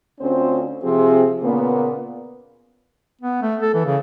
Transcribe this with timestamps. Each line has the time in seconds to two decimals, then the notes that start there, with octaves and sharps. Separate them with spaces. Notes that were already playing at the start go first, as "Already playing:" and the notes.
0.21 D2 C4 C#4 F4 C5
0.84 C3 F3 C4 G#4
1.43 A#2 C#3 A#3 B3
3.21 B3
3.42 A3
3.62 A4
3.74 E3
3.85 C#3